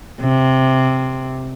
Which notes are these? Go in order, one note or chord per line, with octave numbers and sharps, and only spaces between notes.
C3